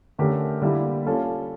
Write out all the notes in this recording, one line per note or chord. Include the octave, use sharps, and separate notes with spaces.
D3 A3 C#4 G4 A#4
D3 G3 A#3 E4 G4
G3 C#4 F4 A4